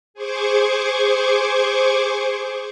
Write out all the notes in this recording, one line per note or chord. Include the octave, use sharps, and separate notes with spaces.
G#4 C5 C#6 D6 G#6